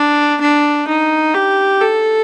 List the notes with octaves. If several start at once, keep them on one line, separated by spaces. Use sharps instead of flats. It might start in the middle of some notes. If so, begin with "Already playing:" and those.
Already playing: D4
D4
D#4
G4
A4